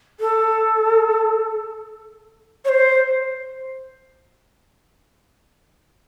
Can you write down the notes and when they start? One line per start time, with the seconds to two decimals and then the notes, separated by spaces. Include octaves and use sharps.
0.20 A4
2.65 C#5
2.69 C5